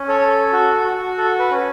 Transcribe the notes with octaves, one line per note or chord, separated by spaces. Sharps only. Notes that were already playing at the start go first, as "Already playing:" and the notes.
Already playing: C#4
A4 C#5
A4
F#4
F#4
A4
B4
C#4